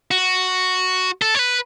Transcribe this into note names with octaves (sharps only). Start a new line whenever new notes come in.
F#4
A4
C#5
B4